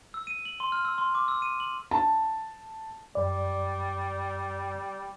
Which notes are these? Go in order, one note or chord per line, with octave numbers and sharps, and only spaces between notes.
E6
D#7
F#7
C6
F6
E6
C6
D6
E6
D#7
F#7
A5
F#2 G3 D5